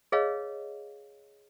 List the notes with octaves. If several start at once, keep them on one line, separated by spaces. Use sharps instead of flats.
G#4 B4 C#5 D#5 F5